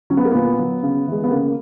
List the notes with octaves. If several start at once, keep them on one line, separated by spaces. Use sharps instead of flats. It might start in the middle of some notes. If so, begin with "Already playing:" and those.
F#3 C#4
B3
A#3
A#2 B3
F#3
C#3
E3 G#3
B3
C#3 A#3